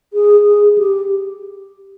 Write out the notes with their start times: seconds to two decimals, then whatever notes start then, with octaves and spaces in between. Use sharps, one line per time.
0.13 G#4
0.46 G#4
0.78 G4